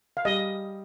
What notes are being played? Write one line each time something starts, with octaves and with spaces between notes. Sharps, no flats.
F5
G3 D#5